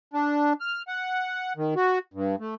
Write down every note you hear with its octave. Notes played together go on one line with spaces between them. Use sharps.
D4
F6
F#5
D#3
F#4
G2
A3